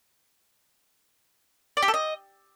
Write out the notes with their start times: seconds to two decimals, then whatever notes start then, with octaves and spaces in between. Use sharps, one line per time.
1.77 D5
1.82 G4
1.88 A4
1.94 D#5